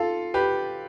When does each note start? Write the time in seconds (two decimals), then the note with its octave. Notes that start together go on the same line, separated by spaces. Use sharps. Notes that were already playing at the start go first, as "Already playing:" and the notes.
Already playing: F4 A4
0.34 G4 B4